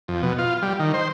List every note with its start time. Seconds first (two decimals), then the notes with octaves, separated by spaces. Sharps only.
0.08 F2
0.23 B2
0.39 F4
0.62 G3
0.80 D#3
0.94 C5